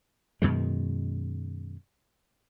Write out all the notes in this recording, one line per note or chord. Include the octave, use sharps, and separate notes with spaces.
F#2 B2 D#3 G#3